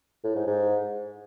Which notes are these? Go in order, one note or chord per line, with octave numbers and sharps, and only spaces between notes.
A2
G#2
G#2